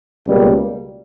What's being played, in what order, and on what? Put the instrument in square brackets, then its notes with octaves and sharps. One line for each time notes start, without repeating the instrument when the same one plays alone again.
[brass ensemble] C#2 B2 G3 A#3